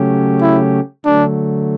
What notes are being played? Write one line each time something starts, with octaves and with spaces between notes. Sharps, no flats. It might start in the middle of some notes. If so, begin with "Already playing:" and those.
Already playing: C#3 F#3 A3 C#4 G4
E4
D3 F#3 A3 D4